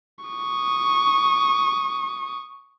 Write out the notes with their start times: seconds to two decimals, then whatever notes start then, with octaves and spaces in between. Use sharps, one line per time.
0.25 C#6 D#6